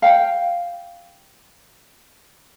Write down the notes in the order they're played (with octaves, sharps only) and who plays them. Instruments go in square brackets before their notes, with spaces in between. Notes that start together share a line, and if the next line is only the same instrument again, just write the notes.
[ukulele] F5 G5